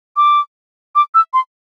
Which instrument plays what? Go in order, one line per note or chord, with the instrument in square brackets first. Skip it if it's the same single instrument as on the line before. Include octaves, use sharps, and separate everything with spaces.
[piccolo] D6
D6
E6
C6